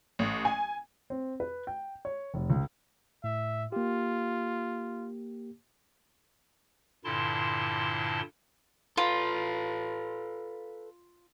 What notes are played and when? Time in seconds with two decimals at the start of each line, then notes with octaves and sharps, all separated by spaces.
0.19 A1
0.45 G#5
1.10 C4
1.40 B4
1.67 G5
2.05 C#5
2.34 F1
2.50 C#2
3.24 A2 E5
3.72 A#3 F4 G4
7.05 G2 A#2 D3 E4 A5 C6
8.97 F4 A4 B4